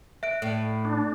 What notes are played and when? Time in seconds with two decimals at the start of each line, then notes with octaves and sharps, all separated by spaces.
0.23 E5 F#6 D7
0.42 A2
0.85 D4